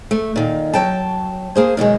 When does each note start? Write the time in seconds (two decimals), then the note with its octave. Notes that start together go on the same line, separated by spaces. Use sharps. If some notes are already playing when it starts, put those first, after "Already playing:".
0.11 A3
0.36 A#2 D#3
0.73 F#3 G5 A5
1.56 A#3 G#4 C5
1.77 F#2 B2 D#3 G#3